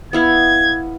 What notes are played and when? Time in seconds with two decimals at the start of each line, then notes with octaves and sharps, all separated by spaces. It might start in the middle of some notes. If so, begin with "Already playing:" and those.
0.13 B3 E4 F5 G#6